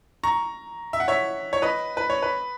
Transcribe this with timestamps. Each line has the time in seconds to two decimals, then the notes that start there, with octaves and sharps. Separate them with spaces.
0.23 A#5 C#6
0.93 E5
1.00 F#5
1.08 C#5 E5
1.53 C#5
1.62 B4 D#5
1.97 B4
2.10 C#5
2.23 B4